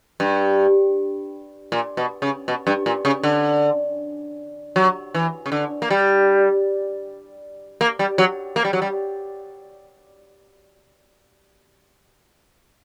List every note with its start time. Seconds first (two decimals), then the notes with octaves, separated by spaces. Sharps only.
0.20 G2
1.72 A#2
1.97 B2
2.22 C#3
2.48 B2
2.67 G2
2.86 A#2
3.05 C#3
3.23 D3
4.76 F#3
5.14 E3
5.46 C#3
5.52 D3
5.82 A#3
5.91 G3
7.81 A#3
7.99 G3
8.18 F#3
8.56 A#3
8.65 G3
8.73 F#3
8.82 G3